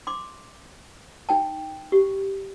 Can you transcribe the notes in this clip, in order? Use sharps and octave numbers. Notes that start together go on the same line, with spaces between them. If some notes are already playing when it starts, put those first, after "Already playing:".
C6 D6
D#4 G5 A5
G4